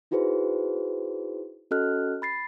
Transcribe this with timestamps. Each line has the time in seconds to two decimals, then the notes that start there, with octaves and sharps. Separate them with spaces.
0.11 D#4 E4 F#4 G#4 B4 C5
1.71 C#4 F#4 A4 D#5 F6 F#6
2.22 B5 A6 C7